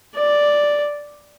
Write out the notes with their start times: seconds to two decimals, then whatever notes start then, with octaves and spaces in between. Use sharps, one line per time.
0.16 D5